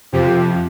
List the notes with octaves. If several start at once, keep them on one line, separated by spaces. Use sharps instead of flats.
F2 C3 F3 G4